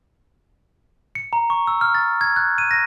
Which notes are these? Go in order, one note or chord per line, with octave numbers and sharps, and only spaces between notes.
C#7
A#5
C#6
E6
F6
A6
G#6
F#6
D#7
A#6